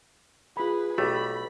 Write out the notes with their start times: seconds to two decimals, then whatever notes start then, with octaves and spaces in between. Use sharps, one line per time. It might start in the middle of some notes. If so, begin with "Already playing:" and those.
0.57 F4 G#4 B4 B5
0.98 B1 A3 G4 B5